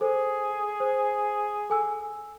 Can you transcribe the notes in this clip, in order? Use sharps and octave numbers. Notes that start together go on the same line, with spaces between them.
G#4 A4 C5
C5
A4 G#5 E6